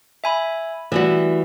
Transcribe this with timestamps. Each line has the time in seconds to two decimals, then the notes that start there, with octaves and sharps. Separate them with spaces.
0.24 E5 G#5 B5
0.92 E3 G3 A3 F#4